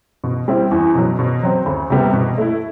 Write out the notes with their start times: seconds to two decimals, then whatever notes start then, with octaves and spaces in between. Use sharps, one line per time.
0.24 B2
0.48 G3 C4 E4
0.71 E2
0.95 B2 F#3
1.19 B2
1.43 F#3 C4
1.66 D2
1.90 C3 G3 B3
2.13 B2
2.38 A3 E4